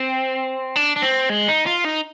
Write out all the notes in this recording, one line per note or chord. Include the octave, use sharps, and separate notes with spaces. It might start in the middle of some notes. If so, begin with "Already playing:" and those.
Already playing: C4
D4
D4
C4
G#3
D#4
F4
D#4